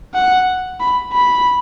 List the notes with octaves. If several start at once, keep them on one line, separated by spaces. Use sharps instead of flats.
F#5
B5
B5